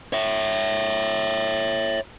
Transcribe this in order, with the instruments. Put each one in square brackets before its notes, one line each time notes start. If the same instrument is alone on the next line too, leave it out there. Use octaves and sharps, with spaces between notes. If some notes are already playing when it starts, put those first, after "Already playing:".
[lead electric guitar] C#5 E5